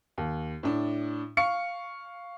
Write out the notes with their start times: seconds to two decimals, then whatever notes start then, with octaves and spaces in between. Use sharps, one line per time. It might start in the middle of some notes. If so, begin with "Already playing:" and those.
0.18 D#2
0.63 A2 D4
1.37 F5 C#6 C#7